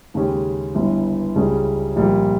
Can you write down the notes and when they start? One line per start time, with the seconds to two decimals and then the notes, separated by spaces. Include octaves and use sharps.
0.14 D#2 C#3 G#3 C#4 G4
0.74 G1 G2 E3
1.35 C#2 C#3 G3 C#4
1.96 A#1 A#2 G3